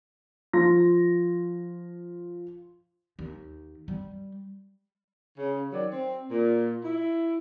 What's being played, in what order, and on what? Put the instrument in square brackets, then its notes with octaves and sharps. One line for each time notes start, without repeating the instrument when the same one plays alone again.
[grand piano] F3 C6 A#6
[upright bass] D#2
G3
[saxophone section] C#3
D#3 F#3 D5
C4
A#2
E4